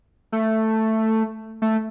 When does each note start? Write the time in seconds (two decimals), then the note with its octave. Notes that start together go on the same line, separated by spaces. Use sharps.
0.32 A3
1.62 A3